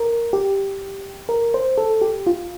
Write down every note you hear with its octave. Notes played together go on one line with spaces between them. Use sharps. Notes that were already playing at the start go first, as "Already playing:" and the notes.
Already playing: A#4
G4
A#4
C5
A4
G4
F4